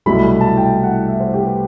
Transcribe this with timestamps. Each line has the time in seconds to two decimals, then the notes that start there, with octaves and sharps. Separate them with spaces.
0.06 C2 B2 F#3 A3 E4 B5
0.24 B5
0.41 A5
0.57 G5
0.83 F#5
1.08 E5
1.20 C5
1.33 G4
1.46 B4